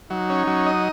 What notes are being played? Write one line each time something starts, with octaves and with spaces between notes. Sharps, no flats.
F#3 D#4
C#4
F#3
D#5